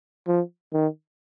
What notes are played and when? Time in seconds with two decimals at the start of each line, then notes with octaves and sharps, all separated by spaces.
0.27 F3
0.73 D#3